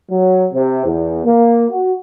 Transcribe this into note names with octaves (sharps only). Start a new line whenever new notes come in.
F#3
C3
E2
A#3
F#4